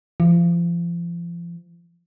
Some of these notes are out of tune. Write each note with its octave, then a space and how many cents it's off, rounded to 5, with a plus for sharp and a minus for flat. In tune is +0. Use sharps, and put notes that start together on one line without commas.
F3 -35